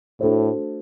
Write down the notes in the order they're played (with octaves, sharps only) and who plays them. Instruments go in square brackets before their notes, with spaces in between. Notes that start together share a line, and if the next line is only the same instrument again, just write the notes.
[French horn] A2 [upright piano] A3 D4 F#4 A4 C5